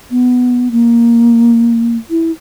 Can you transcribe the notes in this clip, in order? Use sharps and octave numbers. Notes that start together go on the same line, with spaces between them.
B3
A#3
E4